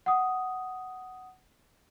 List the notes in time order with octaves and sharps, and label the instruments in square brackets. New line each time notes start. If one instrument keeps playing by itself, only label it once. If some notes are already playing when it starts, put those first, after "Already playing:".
[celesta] F#5 D#6